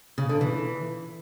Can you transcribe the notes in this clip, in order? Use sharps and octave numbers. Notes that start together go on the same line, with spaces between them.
C#3
D3
E3